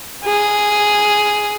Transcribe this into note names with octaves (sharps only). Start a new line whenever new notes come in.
G#4